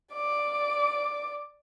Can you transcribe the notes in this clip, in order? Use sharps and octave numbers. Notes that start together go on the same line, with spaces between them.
D5 D6